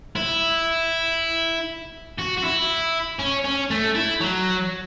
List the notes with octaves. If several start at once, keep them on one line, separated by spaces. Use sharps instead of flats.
E4
F#4
F#4
E4
C#4
C#4
A3
E4
F#3